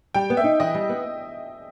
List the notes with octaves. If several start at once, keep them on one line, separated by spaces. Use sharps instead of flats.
G3 G5
B3
E5
D#4
E3 D#5
G3
B3